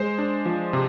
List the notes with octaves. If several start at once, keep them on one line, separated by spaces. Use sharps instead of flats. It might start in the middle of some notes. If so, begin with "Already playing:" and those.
Already playing: G#3 C5
D4
F3
C3